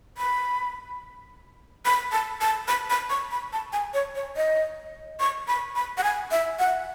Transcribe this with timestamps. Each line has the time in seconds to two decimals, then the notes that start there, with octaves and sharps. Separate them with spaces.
0.18 B5
1.85 B5
2.12 A5
2.41 A5
2.68 B5
2.90 B5
3.10 C#6
3.31 B5
3.53 A5
3.73 G#5
3.94 C#5
4.15 C#5
4.36 D#5
5.20 C#6
5.48 B5
5.76 B5
5.98 F#5
6.04 G#5
6.31 E5
6.59 F#5